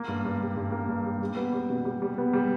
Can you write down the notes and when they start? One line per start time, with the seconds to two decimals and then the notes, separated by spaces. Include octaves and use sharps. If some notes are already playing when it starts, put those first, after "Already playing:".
Already playing: A#3
0.08 G2
0.25 G2
0.41 G3
0.56 G2
0.72 A#3
0.89 G2
1.05 G3
1.21 G3
1.36 B3
1.53 G3
1.70 B2
1.85 G3
2.02 G3
2.18 B3
2.33 G3